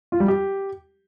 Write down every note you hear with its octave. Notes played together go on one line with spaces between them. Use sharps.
F4
G3
G4